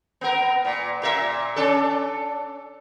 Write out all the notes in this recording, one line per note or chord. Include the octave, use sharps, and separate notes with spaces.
B3 A#4
A#2
A#2 A#4 E5
C#4 D4 A4